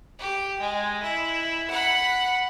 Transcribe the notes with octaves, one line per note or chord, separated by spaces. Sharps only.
G4
G#3
E4
F#5 B5